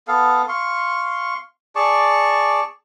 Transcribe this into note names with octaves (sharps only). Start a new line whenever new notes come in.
B3 A4 F5
F5 C6 C#6
G#4 D5 A5 C#6